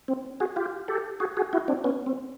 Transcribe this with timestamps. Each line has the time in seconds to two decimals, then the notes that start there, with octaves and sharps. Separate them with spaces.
0.08 C4
0.40 F#4 G#4
0.56 F4 G4
0.88 G4 A4
1.20 F#4 G#4
1.37 F#4 G#4
1.53 E4 F#4
1.68 C4 D4
1.84 B3 C#4
2.06 C4